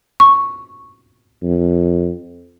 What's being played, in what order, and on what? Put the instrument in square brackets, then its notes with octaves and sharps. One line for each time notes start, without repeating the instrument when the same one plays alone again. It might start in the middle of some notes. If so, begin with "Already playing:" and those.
[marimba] C#6
[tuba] F2